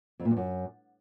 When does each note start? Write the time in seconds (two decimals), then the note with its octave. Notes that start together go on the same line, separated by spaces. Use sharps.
0.20 F2
0.25 A#2
0.31 G2
0.37 F#2